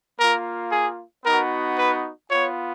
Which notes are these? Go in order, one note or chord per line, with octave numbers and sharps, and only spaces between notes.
A#3 F4 A#4
G#4
B3 D#4 F#4 A#4
B4
B3 F4 C#5